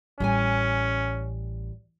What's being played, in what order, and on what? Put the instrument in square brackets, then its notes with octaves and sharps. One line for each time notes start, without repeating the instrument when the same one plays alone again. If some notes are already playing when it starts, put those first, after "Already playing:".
[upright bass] A1 [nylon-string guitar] G3 C#5 G#5 [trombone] C#4